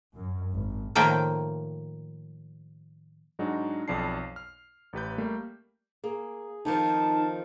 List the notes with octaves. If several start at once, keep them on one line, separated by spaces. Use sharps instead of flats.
F#2
G#1
A2 D#3 F3 A#3 G5
G#2 F#3 G#3 D4 D#4 F#4
B1 F2 D5 A5 C7
F6
A1 G4 B4 G6
G3 A3 A#3
A#3 G#4
F2 D#3 F3 D#4 A5